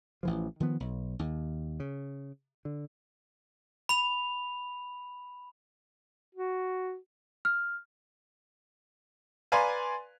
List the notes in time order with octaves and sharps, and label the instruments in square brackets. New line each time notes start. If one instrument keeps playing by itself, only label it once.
[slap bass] A1 E3 F3
D#3 F3 B3
B1
D#2
C#3
D3
[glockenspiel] B5 F7
[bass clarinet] F#4
[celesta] F6
[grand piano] B4 D5 F5 G#5 A#5 C6